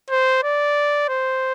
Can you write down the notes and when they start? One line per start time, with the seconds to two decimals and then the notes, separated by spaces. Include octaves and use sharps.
0.10 C5
0.44 D5
1.09 C5